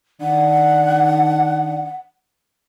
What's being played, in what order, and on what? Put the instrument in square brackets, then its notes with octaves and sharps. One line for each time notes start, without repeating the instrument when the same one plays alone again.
[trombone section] D#3 D4 [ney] F#5